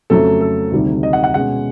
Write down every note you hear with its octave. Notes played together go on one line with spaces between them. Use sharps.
F2 C#3 F#3 A3 A4
A4
D2 C3 D#3 G3
D#5
F#5
F#5
B2 G#3 C#4 F#5